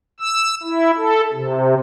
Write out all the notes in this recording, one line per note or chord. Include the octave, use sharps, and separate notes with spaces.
E6
E4
A4
C3